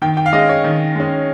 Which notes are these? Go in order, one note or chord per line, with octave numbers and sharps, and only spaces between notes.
D#3 G5
G5
F5
G#3 C#4 D#5
C#5
D#3
G#3 C#4